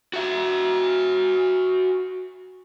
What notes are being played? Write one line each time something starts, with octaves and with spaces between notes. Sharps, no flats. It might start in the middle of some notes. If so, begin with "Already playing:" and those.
F#4 E5